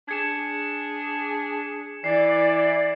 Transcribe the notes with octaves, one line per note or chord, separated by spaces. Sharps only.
D4 G#4 G#6 C#7 E7
E3 D5 C7